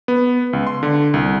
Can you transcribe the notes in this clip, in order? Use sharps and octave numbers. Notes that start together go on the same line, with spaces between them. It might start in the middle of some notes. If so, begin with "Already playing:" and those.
B3
C#2
C6
D3
C2